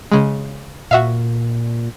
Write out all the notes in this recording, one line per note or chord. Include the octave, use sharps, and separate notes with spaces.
C#3 G#3
A#2 F#4 E5 F5